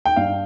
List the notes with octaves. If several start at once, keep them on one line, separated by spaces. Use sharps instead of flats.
G5
G2 F5